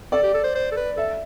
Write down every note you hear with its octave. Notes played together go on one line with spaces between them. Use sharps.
A4 D5
G4
A4
C5
C5
A4
B4
A4 E5